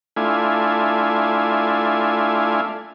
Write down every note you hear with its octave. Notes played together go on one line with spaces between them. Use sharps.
A3 D4 E4 F4 G#5